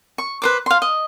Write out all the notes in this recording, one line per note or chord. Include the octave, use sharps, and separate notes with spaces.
C#6
B4 C5 D6
F5 C6
D#5